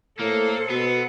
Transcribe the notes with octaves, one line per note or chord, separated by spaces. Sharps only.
A2 A#3 A4 C5
B2 B3